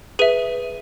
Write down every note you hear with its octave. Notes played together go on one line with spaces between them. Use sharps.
G#4 B4 E5 D#7